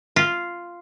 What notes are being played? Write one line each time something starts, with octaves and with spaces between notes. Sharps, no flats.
F4